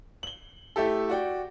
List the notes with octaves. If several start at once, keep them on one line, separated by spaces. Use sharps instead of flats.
F#7 G7
A3 E4 G4 A4
F#4 D5 G5